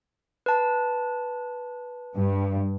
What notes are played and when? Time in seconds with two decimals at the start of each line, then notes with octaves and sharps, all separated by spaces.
0.46 B4 A5
2.17 G2